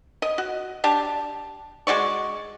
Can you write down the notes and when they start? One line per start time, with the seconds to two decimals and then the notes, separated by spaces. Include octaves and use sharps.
0.22 D#5
0.38 F#4
0.84 D4 G4 A5
1.87 G#3 F#4 D5 C#6